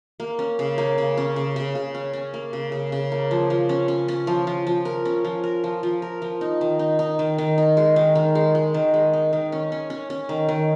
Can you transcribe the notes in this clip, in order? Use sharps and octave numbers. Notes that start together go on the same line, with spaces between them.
A#3
C#4
C#3
A#3
C#3
C#4
C#3
C#3
C#3
C#4
C#4
A#3
C#3
C#3
C#3
A#3
F3
F3
C#4
C#4
C#4
F3
F3
F3
A#4
C#4
F3
A#4
F3
F3
A#4
F3
D#4
D#3
D#4
D#4
D#3
D#3
D#4
G#3
D#3
D#3
G#3
G#3
D#3
G#3
D#4
D#3
C#4
C#4
C#4
C#4
D#3
D#3